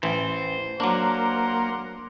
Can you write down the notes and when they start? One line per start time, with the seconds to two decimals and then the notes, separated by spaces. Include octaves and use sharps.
0.03 A1 E3 C5
0.80 F#3 A#3 D4 F#5 C6 D6